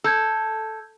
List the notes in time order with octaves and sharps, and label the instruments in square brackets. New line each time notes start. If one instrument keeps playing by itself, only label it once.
[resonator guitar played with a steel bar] A4 [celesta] E6 G6 G#6